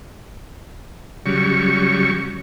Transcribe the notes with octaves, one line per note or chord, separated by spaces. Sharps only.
C#3 F#3 G3 C#6